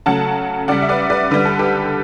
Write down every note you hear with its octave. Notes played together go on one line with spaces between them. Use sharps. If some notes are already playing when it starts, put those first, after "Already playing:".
C#3 F#3 A3 F#5 A5
C#3 G3 D5 F#5
E5
B4 D5
B4 D5
D3 G3 B4
A4
G4 B4